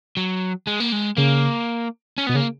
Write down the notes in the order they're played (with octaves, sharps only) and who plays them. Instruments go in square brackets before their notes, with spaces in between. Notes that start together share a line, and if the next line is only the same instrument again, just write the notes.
[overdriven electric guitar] F#3
G#3
A#3
G#3
[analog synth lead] C#3 [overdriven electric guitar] A#3
[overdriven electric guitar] C#4
[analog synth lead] B2 [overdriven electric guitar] B3
[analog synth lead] C#3 [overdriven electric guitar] A#3